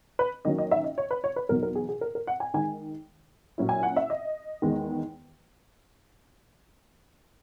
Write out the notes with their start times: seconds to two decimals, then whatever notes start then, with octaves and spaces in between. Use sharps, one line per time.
0.19 B4
0.45 D#3 F#3 A#3 C#4 D#5
0.58 D#5
0.71 E5
0.84 D#5
0.98 C#5
1.11 B4
1.24 C#5
1.36 B4
1.49 E2 B2 F#3 B3 D#4 A#4
1.63 A#4
1.75 G#4
1.89 G#4
2.01 A#4
2.15 A#4
2.27 F#5
2.40 G#5
2.54 D#3 G#3 D#4 G#5
3.58 A#2 F#3 C#4 E4
3.69 G#5
3.83 F#5
3.96 E5
4.10 D#5
4.62 E2 D#3 G#3 B3